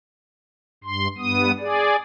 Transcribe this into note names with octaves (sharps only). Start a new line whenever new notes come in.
G2 C6
G2 B3 D#6
G#4 D5